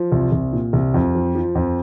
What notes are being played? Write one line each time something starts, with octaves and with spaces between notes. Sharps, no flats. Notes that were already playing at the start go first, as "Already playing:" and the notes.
Already playing: F3
C2
C2
A#2
C2
F2
F3
F3
F2